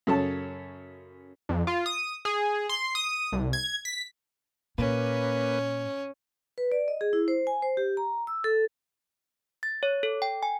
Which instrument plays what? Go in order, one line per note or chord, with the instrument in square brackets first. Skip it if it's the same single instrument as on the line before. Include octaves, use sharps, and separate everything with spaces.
[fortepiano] F#2 C#3 A4 C#5 A5
[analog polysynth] F2
F4
D#6
G#4
C6
D#6
C2
G#6
B6
[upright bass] A#2 [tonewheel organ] A#3 B4 [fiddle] C#4
[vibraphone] B4
D5
D#5
G#4
E4
C5
G#5
C5
G4
A#5
E6
A4
[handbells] A6
C#5
A4
G5
G#5